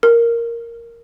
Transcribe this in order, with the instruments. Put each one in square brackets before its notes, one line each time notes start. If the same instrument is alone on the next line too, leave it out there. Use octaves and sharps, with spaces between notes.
[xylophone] A#4